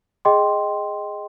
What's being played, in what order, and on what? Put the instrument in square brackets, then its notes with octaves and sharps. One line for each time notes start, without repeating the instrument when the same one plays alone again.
[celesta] G#4 D#5 G5 C6